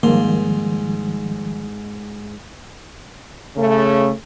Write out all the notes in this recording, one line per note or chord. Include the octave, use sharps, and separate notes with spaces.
G#2 D#3 F3 G3 A#3 C6
C#3 A3